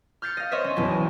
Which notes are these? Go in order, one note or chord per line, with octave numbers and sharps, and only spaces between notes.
F6 G6 A6 C7 C#7
D#5 F5
C5 C#5 D#5 E5
C#4
B1 E2